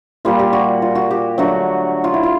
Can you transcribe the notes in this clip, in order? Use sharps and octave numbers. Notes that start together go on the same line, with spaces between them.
A#2 G3 A#3 F4
G4
F#4
F4
F#4
G4
D3 F#3 A3 F#4
F4
E4
F4